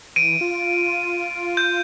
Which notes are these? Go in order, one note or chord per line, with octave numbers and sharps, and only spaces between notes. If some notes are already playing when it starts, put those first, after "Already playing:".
E3 D7 D#7
F4
G6